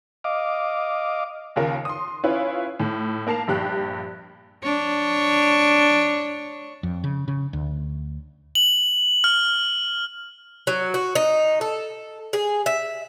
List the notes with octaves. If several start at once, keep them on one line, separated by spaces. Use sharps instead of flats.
D#5 F5 D6
D#2 C#3 F4 A#4
C6 D#6
C#4 E4 F4 B4 C#5
A2
A#3 A#4 A5 C7 F7
A#1 G2 G4 F#6
D4 C#5
F2
C#3
C#3
D2
F#7
F6
F#3
F#4
D#4
A4
G#4
E5